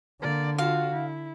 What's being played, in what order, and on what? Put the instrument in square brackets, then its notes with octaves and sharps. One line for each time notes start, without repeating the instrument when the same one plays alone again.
[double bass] D3 [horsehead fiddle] A#3 D5
[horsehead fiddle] F4 F#4 [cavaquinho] F5
[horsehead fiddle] E4